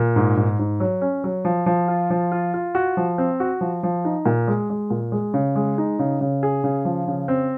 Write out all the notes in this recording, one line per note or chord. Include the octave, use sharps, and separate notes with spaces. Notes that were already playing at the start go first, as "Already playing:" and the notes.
Already playing: A#2
G#2
G#2
G#2
F#3
C#4
F#3
F3
F3
F4
F3
F4
F4
F#4
F3
C4
F#4
F3
F3
D#4
A#2
G#3
G#3
A#2
G#3
C#3
G#3
D#4
C#3
C#3
G#4
C#3
F3
C#3
C4